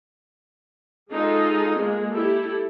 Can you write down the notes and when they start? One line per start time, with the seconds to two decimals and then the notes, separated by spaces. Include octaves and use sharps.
1.11 G#3 D#4 F4 G#4 A4
1.75 G#3 A#3
2.10 E4 G4 A4